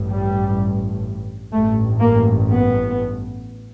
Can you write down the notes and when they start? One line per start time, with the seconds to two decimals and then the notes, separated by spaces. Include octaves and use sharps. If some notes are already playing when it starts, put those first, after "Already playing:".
Already playing: A1 G2
0.08 G3
1.52 A1 G2 A3
2.00 A#3
2.49 B3